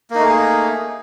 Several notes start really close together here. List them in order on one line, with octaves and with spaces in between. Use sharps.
A#3 D#4 A3 G#4